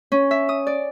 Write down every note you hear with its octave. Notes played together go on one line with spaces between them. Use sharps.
C#4
E5
D#6
D5